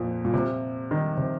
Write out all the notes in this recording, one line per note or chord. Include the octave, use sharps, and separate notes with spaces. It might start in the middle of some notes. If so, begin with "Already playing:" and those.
Already playing: F2 A#2
A#2
C3
D#3
C3